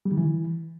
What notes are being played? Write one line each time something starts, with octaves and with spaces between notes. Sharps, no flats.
G3
D#3
E3